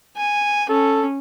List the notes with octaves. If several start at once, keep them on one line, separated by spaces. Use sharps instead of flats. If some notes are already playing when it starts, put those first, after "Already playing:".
G#5
C#4 A4